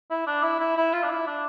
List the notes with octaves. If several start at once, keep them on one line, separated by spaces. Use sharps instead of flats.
E4
D4
E4
E4
E4
F4
D4
E4
D4